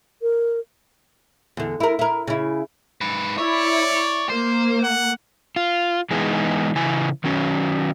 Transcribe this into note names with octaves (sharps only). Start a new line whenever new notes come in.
A#4
E2 D3
E4 A#4
E4 A#4
C#3 E4
G#2 B4
E4 C#5 D5
A#3 C5
F#5
F4
E3 G#3 B3 D#4 G#4
C#3 E3 G#5
D#3 F#3 C#4